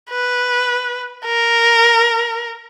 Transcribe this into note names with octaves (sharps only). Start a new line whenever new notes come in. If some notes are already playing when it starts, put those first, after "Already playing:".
B4
A#4